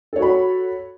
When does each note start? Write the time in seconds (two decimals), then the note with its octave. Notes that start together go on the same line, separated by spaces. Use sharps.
0.13 A4
0.16 C#5
0.19 F#4
0.22 B5